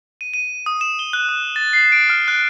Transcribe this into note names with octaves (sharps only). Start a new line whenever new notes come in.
D#7
D#7
D#6
E7
G7
F#6
D#6
A6
C7
D7
F6
F#6